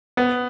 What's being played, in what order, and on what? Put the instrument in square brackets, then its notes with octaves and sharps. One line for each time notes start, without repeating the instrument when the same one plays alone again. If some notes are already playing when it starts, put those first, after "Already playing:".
[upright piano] B3